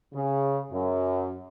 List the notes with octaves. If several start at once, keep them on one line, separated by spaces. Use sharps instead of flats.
C#3
F#2